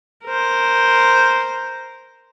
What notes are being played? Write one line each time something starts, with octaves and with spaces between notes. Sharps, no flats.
A#4 C5